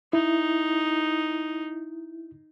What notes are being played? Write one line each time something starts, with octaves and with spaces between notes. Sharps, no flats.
D#4 E4